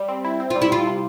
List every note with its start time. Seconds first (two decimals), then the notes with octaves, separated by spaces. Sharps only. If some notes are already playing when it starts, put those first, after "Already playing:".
Already playing: G3
0.08 C4
0.25 E4
0.40 C4
0.50 F4
0.56 G3
0.62 E4
0.71 G3 F4
0.87 C3